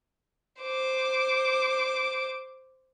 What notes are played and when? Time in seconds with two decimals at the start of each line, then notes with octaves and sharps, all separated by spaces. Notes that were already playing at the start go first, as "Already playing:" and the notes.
0.62 C5 D6